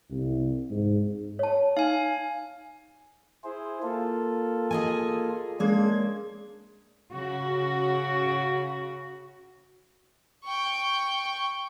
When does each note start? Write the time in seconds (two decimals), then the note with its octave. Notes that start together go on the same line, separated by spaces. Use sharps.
0.10 C2
0.70 G#2
1.39 C#5 A5
1.77 D#4 F5 G#5
3.44 E4 G#4 C5
3.83 A#3 F4 A4
4.71 G#4 D#5 G#5
5.60 G#3 A#3 C#4 D4 G#6
7.11 C#3 F#4
10.44 G5 C#6